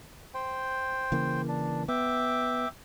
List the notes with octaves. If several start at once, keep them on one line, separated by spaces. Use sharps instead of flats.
C5 G5
C#3 E3 A#3
D4
B3 E5 G5 D6